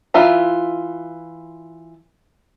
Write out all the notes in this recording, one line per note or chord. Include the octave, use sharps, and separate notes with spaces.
E3 F4 E5 A#5